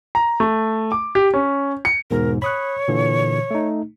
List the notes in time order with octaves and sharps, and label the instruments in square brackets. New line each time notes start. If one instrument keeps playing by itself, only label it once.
[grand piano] A#5
A3
D6
G4
C#4
C#7
[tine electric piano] E2 G#2 B2 [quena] A#4
[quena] C#5 [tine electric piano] B5 D#6 F#6
[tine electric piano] A#2 D3 E3
A3 D#4